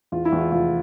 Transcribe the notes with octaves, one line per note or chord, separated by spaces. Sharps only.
E2 F4
E4
E2
F4
F1 F4